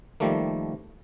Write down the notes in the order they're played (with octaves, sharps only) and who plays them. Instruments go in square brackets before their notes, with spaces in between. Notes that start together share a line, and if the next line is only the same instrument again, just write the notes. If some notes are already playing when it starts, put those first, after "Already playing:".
[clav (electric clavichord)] D#3 F3 G3 A3 A#3